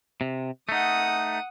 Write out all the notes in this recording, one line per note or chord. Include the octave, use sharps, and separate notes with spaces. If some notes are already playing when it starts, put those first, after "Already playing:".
C3
A3 D#4 F#5 D#6